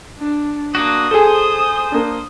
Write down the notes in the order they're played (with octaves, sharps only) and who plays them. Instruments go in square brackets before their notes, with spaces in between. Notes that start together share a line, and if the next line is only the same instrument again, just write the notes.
[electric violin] D4
[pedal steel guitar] A#3 D4 F#4 [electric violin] D#6
[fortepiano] G#4 A4 [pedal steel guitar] C5
[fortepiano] A#3 D4